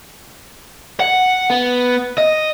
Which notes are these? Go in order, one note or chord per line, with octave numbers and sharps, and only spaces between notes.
F#5
B3
D#5